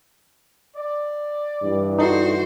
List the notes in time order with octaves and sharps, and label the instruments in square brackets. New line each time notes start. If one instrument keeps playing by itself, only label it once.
[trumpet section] D5
[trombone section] G2 E3
[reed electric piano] D#4 A4 [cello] F#4 C5